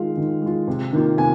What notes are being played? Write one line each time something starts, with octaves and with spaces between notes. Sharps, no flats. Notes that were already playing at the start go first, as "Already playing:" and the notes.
Already playing: D#3 G#3 F4 F5
D#3
G#3 F4
C3
D#3 A#3 F4
C3 G#5